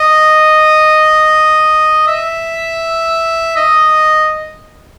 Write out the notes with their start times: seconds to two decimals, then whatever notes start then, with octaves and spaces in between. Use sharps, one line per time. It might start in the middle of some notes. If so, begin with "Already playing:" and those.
Already playing: D#5
2.07 E5
3.56 D#5